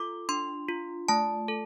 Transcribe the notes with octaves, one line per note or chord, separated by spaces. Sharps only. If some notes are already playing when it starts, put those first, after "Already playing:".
Already playing: F4 A4 D6
D4 C6
F4
A3 A5
A4